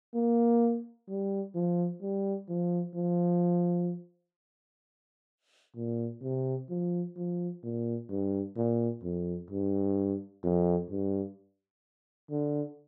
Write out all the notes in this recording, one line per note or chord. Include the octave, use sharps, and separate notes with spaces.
A#3
G3
F3
G3
F3
F3
A#2
C3
F3
F3
A#2
G2
A#2
F2
G2
F2
G2
D3